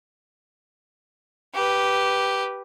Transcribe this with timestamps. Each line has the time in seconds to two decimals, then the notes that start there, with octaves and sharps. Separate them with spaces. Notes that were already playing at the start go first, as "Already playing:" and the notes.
1.54 G4 B4